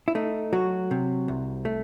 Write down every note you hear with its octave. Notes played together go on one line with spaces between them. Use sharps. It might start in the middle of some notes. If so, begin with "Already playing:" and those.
E4
A3 D#4
F#3 F#4
C3
C2
A3